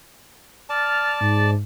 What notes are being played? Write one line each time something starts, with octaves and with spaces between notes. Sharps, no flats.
D5 A5 F6
G#2